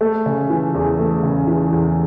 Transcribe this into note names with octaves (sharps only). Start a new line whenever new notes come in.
A3
C#3
E3
E2
A3
C#3
E3
E2